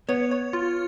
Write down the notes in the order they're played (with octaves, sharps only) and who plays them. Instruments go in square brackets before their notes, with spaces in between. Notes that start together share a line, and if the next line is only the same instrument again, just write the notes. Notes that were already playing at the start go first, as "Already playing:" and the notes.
[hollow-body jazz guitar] B3 [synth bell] C#5
[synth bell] C#5
F4